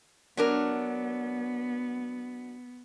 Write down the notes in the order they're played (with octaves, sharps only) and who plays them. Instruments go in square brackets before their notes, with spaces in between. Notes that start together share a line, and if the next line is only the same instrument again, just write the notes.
[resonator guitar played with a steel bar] F#3 D4 A#4 [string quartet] B3